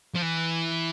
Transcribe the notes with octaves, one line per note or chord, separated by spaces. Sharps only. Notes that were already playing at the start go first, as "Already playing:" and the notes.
F3
E3